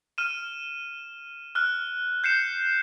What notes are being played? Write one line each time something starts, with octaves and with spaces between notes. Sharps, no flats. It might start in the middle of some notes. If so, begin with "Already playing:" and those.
F6 D#7 E7
F6 F#6
G6 C7 C#7 E7